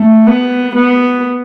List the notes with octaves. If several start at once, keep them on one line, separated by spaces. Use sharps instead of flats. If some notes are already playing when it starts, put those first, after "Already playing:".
Already playing: A3
B3
B3